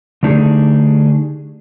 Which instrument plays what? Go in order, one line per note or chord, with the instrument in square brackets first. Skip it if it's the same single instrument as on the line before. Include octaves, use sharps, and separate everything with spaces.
[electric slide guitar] D3 A3 D4 D#4 G4 G#4